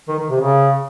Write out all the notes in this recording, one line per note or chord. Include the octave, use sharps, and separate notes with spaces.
D#3
D#3
C3
C#3